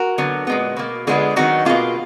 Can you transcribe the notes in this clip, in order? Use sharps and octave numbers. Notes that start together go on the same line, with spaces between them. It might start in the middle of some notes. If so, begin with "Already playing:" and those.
Already playing: F#4 A#4
D3 F#3 B3
A#2 G#3 B3
B2 A#3
D3 G#3 B3 F4 G#4
D#3 F#3 B3 D#4 F#4
B2 A#3 F4 G#4